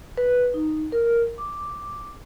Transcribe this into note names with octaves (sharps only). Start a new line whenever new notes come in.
B4
D#4
A#4
D6